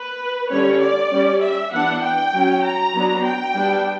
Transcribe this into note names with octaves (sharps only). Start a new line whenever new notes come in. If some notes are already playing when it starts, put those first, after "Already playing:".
Already playing: B4
D3 G3 C#4 C#5
D5
G3 C#4
E5
E3 B3 D4 F#5
G5
F#3 C#4
A#5
F#3 B3 D4
G5
G3 B3 D4